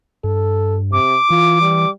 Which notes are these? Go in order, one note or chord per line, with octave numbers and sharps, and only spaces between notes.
G2 A4
C3 D6
E3 F4
G3